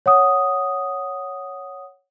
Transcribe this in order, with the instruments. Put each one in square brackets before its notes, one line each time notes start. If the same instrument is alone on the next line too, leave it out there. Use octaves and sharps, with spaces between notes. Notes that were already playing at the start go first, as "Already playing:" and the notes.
[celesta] C#5 F#5 D#6